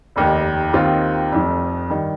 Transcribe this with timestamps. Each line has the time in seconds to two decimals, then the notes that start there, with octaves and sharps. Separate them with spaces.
0.16 F1 D#2 D#3
0.74 D#2 D#3 C4 F4
1.32 F1 F2 F3
1.90 G2 D#3